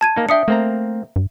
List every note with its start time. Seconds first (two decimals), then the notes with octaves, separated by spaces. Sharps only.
0.01 A5 G#6 D#7
0.16 A#3 D#4
0.29 D4 E5 G5 D#6 C#7
0.48 A3 A#3 C4 A#5
1.16 G2